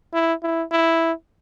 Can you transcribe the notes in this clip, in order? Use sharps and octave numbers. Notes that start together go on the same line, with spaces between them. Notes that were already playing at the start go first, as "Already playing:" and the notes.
E4
E4
E4